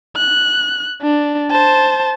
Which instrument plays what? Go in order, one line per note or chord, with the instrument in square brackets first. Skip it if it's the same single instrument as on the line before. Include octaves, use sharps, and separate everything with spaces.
[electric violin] F#6
D4
C5 A5